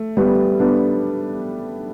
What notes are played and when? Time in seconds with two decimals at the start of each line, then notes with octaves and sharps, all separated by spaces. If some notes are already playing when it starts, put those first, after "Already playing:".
Already playing: A3
0.17 G3 B3
0.59 B3 D4